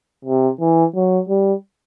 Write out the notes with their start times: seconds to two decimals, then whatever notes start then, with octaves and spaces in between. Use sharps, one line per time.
0.25 C3
0.60 E3
0.95 F#3
1.29 G3